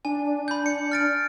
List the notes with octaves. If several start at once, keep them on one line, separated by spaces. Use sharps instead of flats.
D4 G#5
B5 G6
C#7
F6 A6 D7